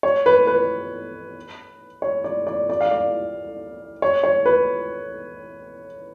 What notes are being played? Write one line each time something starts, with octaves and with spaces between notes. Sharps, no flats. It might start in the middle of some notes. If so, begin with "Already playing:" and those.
C#5
B4
B4
C#5
D5
D5
D5
F5
D5
C#5
C#5
B4